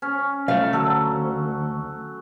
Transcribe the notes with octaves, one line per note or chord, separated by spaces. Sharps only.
C#4
B1 A3 F5
D2 F#3 A4